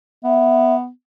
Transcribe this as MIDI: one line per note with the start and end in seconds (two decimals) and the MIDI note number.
0.24 0.89 59
0.24 0.76 76